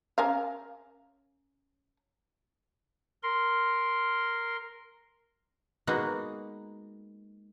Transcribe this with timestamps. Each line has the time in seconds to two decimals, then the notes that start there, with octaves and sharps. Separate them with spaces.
0.18 C#4 A#4 F5
3.23 A#4 C6
5.87 G#3 A#3 B3 D#4 F#4